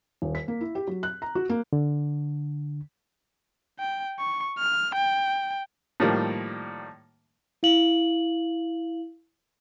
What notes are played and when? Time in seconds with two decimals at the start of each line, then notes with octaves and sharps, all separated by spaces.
0.22 D#1
0.35 B6
0.48 A#3
0.61 E4
0.75 G4
0.87 F#3
1.03 F#6
1.22 A#5
1.35 F#4
1.49 A#3
1.73 D3
3.79 G5
4.19 C#6
4.59 F6
4.95 G5
6.00 A2 D#3 F3 G3 A#3
7.63 E4 F5 F#7